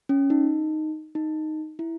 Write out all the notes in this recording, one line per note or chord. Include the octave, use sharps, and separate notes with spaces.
C#4
D#4
D#4
E4